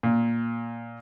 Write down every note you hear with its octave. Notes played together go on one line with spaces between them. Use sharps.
A#2